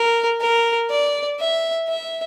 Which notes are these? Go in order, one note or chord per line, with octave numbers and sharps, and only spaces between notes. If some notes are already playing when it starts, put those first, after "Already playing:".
Already playing: A#4
A#4
D5
E5
E5